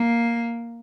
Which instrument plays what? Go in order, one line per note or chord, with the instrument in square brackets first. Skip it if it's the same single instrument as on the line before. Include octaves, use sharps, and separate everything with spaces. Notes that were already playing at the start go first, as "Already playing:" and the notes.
Already playing: [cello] A#3